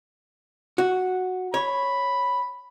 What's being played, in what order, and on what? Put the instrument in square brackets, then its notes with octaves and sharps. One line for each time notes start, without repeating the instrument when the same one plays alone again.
[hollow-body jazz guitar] F#4
[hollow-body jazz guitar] C#5 [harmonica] B5